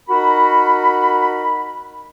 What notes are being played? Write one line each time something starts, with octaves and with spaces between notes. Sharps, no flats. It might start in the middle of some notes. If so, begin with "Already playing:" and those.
D#4 F#4 A#4 B5